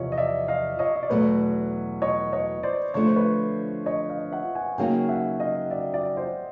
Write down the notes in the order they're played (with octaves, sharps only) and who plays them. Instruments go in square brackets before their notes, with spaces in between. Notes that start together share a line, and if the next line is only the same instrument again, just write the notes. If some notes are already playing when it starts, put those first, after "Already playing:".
Already playing: [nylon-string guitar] E2 C3 F3 [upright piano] C#5 D#5
[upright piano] D#5
D5 E5
D#5 F5
C#5 D#5
D#5
D5
[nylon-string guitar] E2 B2 F#3 A3 [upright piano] B4 C#5
[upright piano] C#5 D#5
C#5 D#5
C5 D5
[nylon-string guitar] D3 F3 A3 D4 [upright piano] C#5
[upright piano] C5
B4 C#5
C#5 D#5
D#5 F5
E5 F#5
F#5 G#5
[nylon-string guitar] C#3 F#3 A#3 D#4 F#4 [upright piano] F5 G5
[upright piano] E5 F#5
D#5 F5
D5 E5
D5 E5
C5 D5